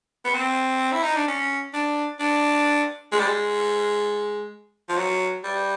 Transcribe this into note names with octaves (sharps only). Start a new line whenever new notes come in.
B3
C4
E4
D#4
D4
C#4
D4
D4
G#3
G3
G#3
F3
F#3
G3